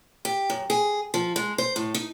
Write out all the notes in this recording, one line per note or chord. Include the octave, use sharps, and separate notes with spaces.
G4
F#2
G#4
F3
G#3
C5
A2
D#4